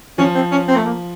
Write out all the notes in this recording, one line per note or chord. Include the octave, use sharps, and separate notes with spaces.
F3 C#4
C4
C#4
C4
A3
A#3